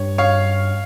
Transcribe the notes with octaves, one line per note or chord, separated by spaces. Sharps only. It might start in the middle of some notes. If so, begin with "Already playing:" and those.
Already playing: G2 C#5
C#5 F5